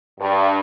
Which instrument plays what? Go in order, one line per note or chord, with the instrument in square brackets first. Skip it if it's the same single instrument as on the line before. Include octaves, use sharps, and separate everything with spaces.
[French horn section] G2